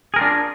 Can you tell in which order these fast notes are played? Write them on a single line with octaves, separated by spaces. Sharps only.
G#4 A#4 F4 D4